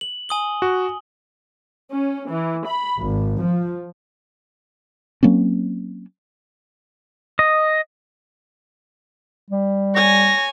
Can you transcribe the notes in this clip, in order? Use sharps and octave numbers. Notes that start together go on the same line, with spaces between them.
F#7
G#5 D#6 G7
F#4
C#4
E3
B5
G#1
F3
F#3 A#3 C4 C#4
D#5
G3
C#5 G#5 A#6